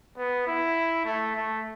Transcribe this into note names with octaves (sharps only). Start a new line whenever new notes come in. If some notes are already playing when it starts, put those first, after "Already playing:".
B3
E4
A3
A3